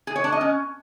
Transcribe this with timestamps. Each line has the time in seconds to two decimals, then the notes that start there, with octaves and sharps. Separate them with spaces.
0.07 G#4
0.16 C#5
0.24 D4
0.32 D#5
0.41 C#4